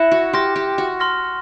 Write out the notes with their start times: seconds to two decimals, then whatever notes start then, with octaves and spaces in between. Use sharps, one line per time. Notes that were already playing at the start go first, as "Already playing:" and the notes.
Already playing: E4 F#6 A#6 C#7 E7
0.12 F#4
0.33 G4 C6 F6 A#6
0.56 G4
0.78 F#4
1.00 C6 F6 A#6